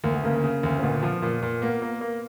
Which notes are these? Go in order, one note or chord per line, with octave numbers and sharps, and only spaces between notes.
D2 A#3
B3
C#3 A#3
C#3
D2
C4
A#2 B3
F3
A#2
A#2
A#3 B3
A#3
A#3